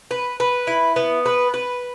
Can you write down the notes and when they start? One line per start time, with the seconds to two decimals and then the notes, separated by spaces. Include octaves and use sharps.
0.11 B4
0.40 B4
0.67 E4
0.96 B3
1.26 B4
1.54 B4